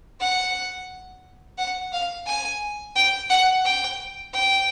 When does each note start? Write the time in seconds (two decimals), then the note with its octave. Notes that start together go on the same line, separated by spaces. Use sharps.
0.20 F#5
1.58 F#5
1.93 F5
2.26 G#5
2.96 G5
3.30 F#5
3.65 G5
4.33 G5